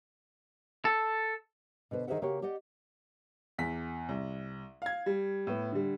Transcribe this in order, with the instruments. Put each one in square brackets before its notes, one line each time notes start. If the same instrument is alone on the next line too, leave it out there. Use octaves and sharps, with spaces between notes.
[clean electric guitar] A4
[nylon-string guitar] B2 D3 B4 C5
D#3 G#4 A#4 C5 E5 F#5
C#3 A#3 F#4 G4 C#5
G4 D5 D#5 F#5
[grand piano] E2 B6
C2
F5 G#6
G3
A2 B3
D3 G3